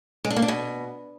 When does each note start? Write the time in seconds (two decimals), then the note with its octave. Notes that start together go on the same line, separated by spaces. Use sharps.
0.25 G#3
0.30 D4
0.36 A#3
0.42 D4
0.48 B2